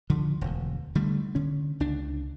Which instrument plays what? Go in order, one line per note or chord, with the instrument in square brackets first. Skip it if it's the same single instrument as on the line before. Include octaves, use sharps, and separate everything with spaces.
[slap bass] D3 F3
E1 D2
D3 G3 A3
D3 C#4
C#2 D4